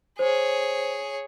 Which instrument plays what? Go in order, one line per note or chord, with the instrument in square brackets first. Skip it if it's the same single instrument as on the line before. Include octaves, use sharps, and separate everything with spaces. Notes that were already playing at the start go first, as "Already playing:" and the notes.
[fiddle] G#4 C#5 [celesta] C5